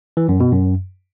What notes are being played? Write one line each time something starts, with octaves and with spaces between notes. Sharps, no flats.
E3
F#2
B2
F#2